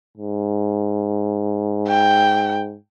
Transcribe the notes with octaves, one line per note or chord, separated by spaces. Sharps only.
G#2
G5